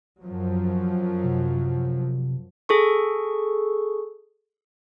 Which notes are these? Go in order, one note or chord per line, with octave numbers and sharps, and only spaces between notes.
F#2 F3 F#3
C3
G#4 A4 C#6